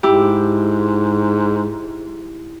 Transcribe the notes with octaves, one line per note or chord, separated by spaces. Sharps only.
G#2 E4 G4